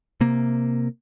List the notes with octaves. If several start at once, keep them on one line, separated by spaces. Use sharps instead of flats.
C3 A#3